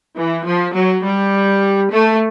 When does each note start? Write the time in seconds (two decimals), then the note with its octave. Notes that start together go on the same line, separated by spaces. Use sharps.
0.18 E3
0.47 F3
0.76 F#3
1.04 G3
1.90 A3